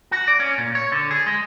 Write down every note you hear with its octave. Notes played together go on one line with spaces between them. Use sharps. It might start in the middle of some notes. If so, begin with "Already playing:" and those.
F#4
D5
C#4
A#2
C#5
D3
G#4
G#3